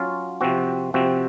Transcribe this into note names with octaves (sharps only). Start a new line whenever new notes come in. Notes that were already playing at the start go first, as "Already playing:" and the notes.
Already playing: F#3 C#4 F4
C3 F3 C4 F#4
C3 F3 C4 F#4